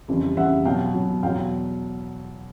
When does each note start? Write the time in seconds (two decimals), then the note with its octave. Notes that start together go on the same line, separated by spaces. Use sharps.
0.08 F2 C#3 E3 G3
0.37 F2 C#3 E3 G3 E5 F#5
0.65 B2 F#3 F5 G5
0.94 B2 F#3
1.23 E2 B2 F#3 F5 G5